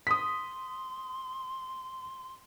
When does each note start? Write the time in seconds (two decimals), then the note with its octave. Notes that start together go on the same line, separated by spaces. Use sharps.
0.07 C6 D#6 B6